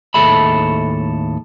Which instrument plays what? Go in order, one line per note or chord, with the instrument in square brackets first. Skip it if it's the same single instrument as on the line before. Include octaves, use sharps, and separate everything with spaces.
[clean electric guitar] D#2 A2 G#4 A4 E5 B5